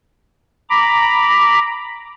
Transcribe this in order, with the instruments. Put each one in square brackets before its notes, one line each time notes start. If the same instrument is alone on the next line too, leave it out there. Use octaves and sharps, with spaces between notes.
[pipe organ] A#5 B5 D6